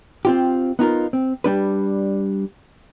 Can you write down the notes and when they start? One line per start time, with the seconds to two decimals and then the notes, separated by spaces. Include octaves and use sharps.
0.25 C4 F4 G4
0.79 B3 D#4 F4 A#4
1.13 C4
1.44 G3 D4 B4